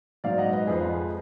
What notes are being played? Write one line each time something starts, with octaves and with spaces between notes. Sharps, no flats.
G#2 F#3 D5 F5
D#5 F#5
B4 D#5
F2 F3 G#3 G#4 B4